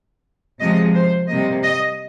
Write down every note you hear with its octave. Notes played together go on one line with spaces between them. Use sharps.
C3 F3 G#3 D#5
C5
C3 G3 A#3 D#5
D#5